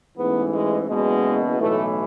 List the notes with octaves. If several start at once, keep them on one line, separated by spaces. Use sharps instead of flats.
A1 G#2 E3 B3
G#3
F#1 E2 B2 G#3
B1 A2 E3 A3